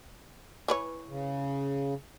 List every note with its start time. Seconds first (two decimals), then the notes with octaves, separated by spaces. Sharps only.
0.68 E3 B4 C#5
1.08 C#3